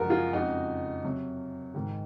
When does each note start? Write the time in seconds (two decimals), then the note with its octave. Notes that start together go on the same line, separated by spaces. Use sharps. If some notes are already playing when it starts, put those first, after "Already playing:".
Already playing: F#2 F3 G#3 F#4 A#4
0.10 F4 G#4
0.33 F2 C#3 G#3 D#4 F#4
1.03 C3 F#3
1.74 G#2 D#3 G#3